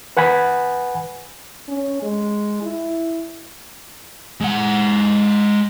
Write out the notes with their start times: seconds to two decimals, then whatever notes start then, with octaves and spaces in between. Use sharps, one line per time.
0.17 B4 F#5 G#5 B5
1.68 C#4
2.03 G#3
2.62 E4
4.41 G#3 F#5